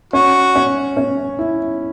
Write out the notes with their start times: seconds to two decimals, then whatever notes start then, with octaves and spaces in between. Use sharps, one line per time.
0.13 C#4 F#4
0.56 C#4
0.97 C#4
1.39 E4